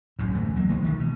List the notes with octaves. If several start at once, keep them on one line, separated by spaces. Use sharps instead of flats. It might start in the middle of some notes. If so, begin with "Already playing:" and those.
A1 F#2 A2
D2 E3 A3
F#3 A#3
B1 D#3 G#3 A#3
D3 D#3 F3
B2